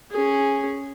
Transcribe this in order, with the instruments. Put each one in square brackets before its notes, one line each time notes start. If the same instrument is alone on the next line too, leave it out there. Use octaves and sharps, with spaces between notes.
[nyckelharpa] C#4 G#4